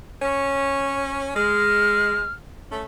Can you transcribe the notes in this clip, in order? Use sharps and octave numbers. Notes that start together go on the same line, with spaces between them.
C#4 C#5
G#3 F6
A3 C#4